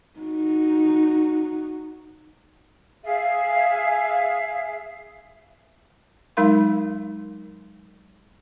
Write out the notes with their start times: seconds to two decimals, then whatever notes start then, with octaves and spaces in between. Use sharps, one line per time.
0.19 D#4 F#4
3.04 G#4 E5 F5
6.37 F#3 G#3 D#4 A#4 F5 C6